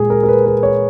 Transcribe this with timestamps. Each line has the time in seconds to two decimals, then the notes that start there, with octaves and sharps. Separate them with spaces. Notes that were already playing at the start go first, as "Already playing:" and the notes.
Already playing: A#2 G#3 G#4
0.10 A#4
0.23 A#4
0.28 B4
0.46 B4
0.63 C#5